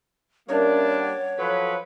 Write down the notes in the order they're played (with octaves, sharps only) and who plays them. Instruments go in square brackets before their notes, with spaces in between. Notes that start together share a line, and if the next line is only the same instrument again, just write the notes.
[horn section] G3 A#3 D4 [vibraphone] C#4 A#4 E5 [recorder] C#5
[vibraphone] F#5
[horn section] F3 F#3 B4 [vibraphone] A4